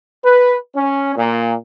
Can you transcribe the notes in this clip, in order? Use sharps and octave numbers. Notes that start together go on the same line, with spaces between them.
B4
C#4
A#2